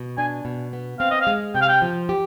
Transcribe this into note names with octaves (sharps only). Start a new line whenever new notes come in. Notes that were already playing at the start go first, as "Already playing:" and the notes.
Already playing: B2
D4 G#5
B2
B3
C4 F5
D#5
F5
G#3
C3 G5
F5
G5
F3
G4